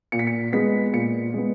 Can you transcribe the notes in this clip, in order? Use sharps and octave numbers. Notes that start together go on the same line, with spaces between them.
A#2 C#7
B6
C#7
G#3 B3 B6
A#2 C#7
G#3 B3